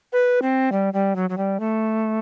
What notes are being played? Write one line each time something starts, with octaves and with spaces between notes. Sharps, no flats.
B4
C4
G3
G3
F#3
F#3
G3
A3